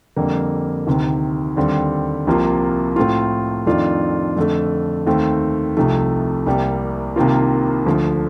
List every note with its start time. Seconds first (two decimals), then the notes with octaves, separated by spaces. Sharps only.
0.17 F2 D3 G3 A#3
0.87 D2 C3 D#3
1.57 D#2 D3 G3 C4
2.27 C2 C3 F3 A#3 F4
2.96 A2 A3 C4 F4
3.67 F2 D#3 A3 D4 F4
4.37 F2 D3 A3
5.07 D#2 D#3 A3 C4
5.77 C2 C3 F3 A3 D#4
6.46 C2 C3 G3 A#3
7.16 C2 C3 D#3 A#3 F4
7.86 D2 D3 F3 A3